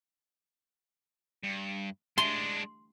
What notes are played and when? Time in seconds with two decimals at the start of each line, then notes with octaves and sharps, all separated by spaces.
1.44 G2
2.18 G#3 D4 C6